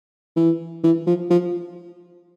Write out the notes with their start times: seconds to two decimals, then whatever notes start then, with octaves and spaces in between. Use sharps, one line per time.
0.36 E3
0.84 E3
1.07 F3
1.30 F3